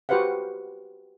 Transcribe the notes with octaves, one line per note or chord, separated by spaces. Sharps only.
F#4 G4 B4 C5 F5 F#5